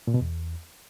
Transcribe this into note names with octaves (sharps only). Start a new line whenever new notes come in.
A#2
B2
E2